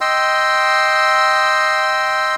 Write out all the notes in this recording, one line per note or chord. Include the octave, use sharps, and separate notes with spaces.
D#5 G5 C6 E6